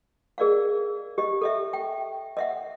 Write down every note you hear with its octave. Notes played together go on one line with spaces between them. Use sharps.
G#4 A#4 D5 D#5 F5
G4 D#5
A4 D#5 E5
G5
D#5 E5 F#5